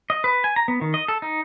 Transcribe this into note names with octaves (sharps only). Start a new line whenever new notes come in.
D#5
B4
G#5
A#5
B3
D#3
D#5
A4
D#4